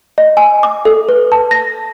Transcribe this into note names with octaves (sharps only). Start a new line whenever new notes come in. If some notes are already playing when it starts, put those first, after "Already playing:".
D#5
G#5
D6
A4
B4
A5
A#6